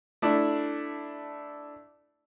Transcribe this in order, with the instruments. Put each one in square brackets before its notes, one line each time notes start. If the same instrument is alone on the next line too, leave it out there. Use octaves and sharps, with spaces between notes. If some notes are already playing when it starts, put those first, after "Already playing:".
[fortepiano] A3 D4 E4